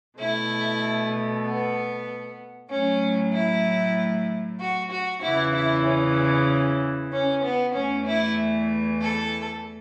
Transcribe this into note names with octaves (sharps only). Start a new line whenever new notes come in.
B2 A3 E4
B3
A2 F#3 A3 C#4
E4
F#4
F#4
E2 C#3 E3 E4
E4
C#4
C#4
B3
E2 E3 A3 C#4
E4
A4